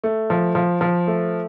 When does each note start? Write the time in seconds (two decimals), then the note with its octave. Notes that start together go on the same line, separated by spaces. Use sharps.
0.04 A3
0.30 F3
0.55 F3
0.81 F3
1.07 A3